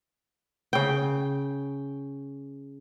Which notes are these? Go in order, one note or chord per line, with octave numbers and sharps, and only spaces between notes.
C#3 G5